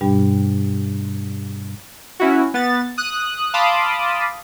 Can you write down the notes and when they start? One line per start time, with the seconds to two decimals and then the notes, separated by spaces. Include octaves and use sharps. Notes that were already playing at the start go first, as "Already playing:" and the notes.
0.01 G2 B2 G3 D4 G4 G5
2.20 C#4 E4 F#4
2.54 B3 A6
2.98 D#6 F#6
3.54 F5 A5 B5 C6 D6 D#6